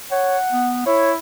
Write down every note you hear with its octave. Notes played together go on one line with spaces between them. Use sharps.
C#5 F#5
B3
E4 C#5